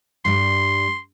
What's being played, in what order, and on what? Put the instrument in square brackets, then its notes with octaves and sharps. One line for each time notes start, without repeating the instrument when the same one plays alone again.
[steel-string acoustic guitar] G2 G3 [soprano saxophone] C6